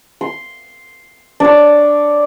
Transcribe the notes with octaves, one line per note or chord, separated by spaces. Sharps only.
C6
D4 C#5